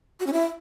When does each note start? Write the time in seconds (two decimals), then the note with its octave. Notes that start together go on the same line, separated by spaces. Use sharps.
0.20 F#4
0.26 C#4
0.33 E4